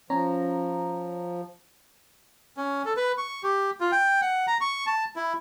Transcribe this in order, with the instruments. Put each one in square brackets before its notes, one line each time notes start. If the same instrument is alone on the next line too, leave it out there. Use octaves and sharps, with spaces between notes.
[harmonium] F3 [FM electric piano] C#4 C#5 A#5
[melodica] C#4
A4
B4
C#6
G4
F4
G5
F#5
A#5
C#6
A5
E4